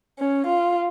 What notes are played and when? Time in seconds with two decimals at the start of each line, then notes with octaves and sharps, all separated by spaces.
0.19 C#4
0.47 F4